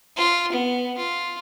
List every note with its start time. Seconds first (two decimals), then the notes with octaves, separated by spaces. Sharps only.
0.17 F4
0.52 B3
0.98 F4